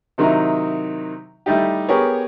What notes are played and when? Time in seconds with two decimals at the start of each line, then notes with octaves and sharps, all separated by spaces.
0.18 C3 D#3 F#3 D#4 E4
1.46 G3 A3 D#4 E4 G4
1.89 B3 G4 G#4 A#4 C#5